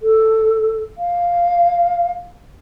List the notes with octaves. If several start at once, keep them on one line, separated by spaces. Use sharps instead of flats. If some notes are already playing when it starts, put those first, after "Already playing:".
A4
F5